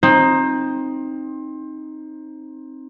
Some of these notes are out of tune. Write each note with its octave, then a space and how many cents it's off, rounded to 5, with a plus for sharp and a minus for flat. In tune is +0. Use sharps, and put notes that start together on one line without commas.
C4 +20 D#4 +0